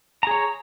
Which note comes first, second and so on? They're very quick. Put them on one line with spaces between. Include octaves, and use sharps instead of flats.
A#5 G#4 C#5